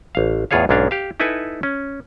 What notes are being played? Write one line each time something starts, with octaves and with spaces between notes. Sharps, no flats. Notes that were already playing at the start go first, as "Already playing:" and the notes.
A1 F5
E2 A2 F4 G#4 C#5 F5
B1 G#2 C#4 D4 F5
G4 F5
D#4 E4 A4 B4 G#5
C#4